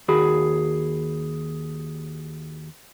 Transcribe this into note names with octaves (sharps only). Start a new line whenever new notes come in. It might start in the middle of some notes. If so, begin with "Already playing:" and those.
D#2 F#4 G#4 B5